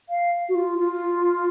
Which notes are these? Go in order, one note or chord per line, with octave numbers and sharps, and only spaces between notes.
F5
F#4
F4
F4